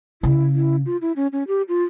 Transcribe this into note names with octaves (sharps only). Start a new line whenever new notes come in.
C#3 E4
E4
F4
E4
C#4
C#4
G4
F4